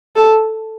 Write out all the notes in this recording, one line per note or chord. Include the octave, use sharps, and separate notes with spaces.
A4